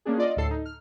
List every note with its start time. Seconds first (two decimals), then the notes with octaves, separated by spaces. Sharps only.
0.05 A#3 C#4 D4 G#4
0.18 F4 D5 D#5
0.37 D2 A2 A4 C7
0.50 D#4
0.65 F6